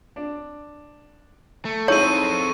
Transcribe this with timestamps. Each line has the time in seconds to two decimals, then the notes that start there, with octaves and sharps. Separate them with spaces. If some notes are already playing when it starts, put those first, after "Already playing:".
0.16 D4
1.65 A3
1.88 C4 D#4 E4 G#4 A4 C#5 C#6 D#7